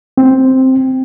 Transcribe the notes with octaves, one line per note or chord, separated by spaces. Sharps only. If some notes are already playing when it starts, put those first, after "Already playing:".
C4